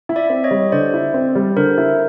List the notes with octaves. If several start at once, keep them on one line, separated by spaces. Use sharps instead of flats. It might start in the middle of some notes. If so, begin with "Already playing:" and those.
E4
D5 E5
C4
C#5 D#5
G3
D3 C5 D5
E4
C4
G3
D3 A#4 C5
E4